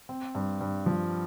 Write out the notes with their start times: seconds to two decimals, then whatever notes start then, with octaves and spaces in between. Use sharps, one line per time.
0.09 C4
0.35 G2
0.61 G2
0.86 F3